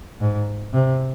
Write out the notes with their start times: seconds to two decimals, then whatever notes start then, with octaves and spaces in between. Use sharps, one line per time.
0.20 G#2
0.74 C3